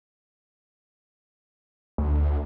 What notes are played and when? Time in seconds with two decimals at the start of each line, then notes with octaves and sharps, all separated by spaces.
1.98 D2